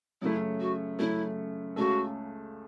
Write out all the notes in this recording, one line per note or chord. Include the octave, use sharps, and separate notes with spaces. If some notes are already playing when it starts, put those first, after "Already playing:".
F#2 C#3 A3 E4
F#4
F#2 C#3 A3 E4
C#2 C#3 A3 C#4 F#4 A4